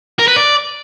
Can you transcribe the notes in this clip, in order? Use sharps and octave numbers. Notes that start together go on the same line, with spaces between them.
A#4
B4
D5